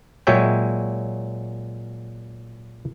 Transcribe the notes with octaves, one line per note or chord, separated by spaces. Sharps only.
A#2 F#3 G#3 C#5 E5 G5